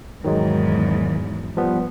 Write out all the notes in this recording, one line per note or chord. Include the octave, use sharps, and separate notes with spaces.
E2 G#2 D#3 F#3 G#3
F3 G3 B3